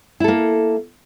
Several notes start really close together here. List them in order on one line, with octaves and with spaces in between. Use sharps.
E4 A4 A#3